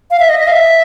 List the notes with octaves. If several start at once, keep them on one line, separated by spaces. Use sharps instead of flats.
F5
E5
D#5
D#5
F5
E5